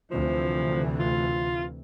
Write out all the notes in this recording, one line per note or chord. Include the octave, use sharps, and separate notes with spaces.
D2 C3 E3 F3
F4